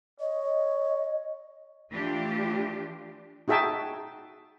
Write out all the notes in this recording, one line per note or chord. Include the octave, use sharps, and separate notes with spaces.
C#5 D#5
E3 A3 D4 F4 G4
D#4 F#4 G#4 E5 G5 A5